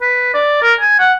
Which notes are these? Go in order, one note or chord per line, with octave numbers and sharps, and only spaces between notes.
B4
D5
A#4
G#5
F#5